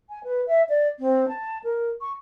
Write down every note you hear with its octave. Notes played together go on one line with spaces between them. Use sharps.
G#5
B4
E5
D5
C4
A5
A#4
C#6